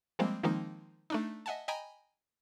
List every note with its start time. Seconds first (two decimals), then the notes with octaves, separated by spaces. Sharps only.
0.19 F3 G3 G#3 A#3 C4
0.43 D#3 F3 G#3 A#3 C4 D#4
1.10 A3 D4 D#4
1.46 D#5 E5 F#5 G#5 A5
1.68 D#5 G5 G#5 A#5 B5 D7